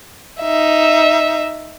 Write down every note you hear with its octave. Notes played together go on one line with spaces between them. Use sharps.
D#4 E5